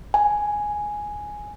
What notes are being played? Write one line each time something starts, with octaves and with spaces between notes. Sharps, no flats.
G#5